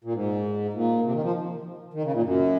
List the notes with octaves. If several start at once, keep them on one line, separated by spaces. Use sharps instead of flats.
A#2
G#2
A#2
C3
D#3
F3
D#3
C#3
A#2
F#2